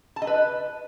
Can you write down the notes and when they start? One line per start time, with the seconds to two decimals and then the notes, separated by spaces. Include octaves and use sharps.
0.16 A5
0.22 D#5
0.27 B4